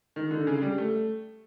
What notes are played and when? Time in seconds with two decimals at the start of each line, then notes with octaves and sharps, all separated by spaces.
0.16 D#3
0.31 D3
0.47 C#3
0.62 G3
0.78 A3